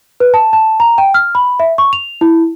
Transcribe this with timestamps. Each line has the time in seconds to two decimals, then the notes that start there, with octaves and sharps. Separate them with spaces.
0.20 B4
0.34 A5
0.53 A5
0.80 A#5
0.98 G5
1.14 F6
1.35 B5
1.60 E5
1.78 C#6
1.93 F7
2.21 E4